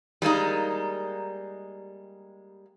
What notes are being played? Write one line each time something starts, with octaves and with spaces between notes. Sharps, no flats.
G3 G#3 A#3 D#4